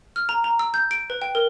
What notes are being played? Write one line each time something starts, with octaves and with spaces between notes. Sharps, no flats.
F6
A#5
A#5
E6
G6
D7
B4
G5
A#4